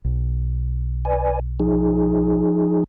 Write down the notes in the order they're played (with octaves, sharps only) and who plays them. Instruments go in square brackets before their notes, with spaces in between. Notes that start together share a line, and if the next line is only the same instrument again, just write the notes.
[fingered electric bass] B1
[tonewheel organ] B4 D5 G#5
F3 D#4 G#4